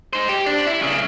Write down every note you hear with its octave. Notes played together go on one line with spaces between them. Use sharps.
D#4 C5
G4
D4
E4
B1 C#3